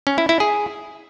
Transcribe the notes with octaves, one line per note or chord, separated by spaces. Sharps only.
C#4
E4
E4
G#4